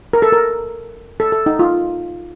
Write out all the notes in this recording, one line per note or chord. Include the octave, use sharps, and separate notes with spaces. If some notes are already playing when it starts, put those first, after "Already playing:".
A#4
A4
A#4
A4
A4
D#4
F4